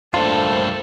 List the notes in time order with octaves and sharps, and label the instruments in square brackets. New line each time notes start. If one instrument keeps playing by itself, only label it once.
[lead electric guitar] G2 A#3 [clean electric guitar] A3 D4 F4 [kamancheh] A4 [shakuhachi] C5